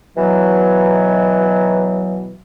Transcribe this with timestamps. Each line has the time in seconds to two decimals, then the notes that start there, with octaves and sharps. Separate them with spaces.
0.16 B2 E3 F#3